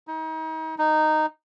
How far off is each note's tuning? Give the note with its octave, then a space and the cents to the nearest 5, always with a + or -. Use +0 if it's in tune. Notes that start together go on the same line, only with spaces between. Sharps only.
D#4 +35
D#4 -10